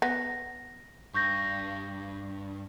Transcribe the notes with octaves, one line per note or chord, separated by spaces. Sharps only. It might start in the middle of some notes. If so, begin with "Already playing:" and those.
B3 A#6
G2 C#6 G6 A#6